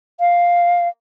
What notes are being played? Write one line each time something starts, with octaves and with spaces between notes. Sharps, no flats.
F5